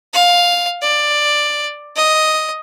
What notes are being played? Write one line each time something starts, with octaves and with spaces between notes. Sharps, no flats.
F5
D5
D#5